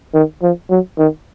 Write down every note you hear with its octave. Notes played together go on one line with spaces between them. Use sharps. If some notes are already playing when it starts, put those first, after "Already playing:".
D#3
F3
F#3
D#3